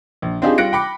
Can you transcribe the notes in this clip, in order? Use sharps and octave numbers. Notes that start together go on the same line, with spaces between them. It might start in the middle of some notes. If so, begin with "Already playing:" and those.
A#1
C4 D4 D#4 F4 G4 G#4
G3 F4 F#6 A#6 C#7 D7
G5 B5 D6 C#7